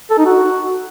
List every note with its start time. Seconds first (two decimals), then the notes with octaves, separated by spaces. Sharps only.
0.10 A4
0.18 D#4
0.26 F#4